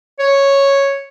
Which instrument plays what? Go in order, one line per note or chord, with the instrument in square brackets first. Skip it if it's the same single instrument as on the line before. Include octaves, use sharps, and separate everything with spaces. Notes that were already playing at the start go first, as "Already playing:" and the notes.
[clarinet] C#5